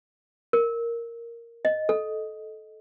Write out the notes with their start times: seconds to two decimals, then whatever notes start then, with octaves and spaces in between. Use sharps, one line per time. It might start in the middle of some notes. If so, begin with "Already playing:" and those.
0.53 A#4
1.65 D#5
1.89 A4